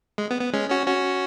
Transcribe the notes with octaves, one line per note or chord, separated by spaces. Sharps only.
G#3
B3
B3
G#3 C#4
C#4 F#4
C#4 F#4